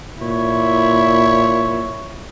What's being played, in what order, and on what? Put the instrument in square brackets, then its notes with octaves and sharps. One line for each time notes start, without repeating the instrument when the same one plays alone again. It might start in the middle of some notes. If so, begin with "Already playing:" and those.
[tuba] A#2 [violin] E4 [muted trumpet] C#5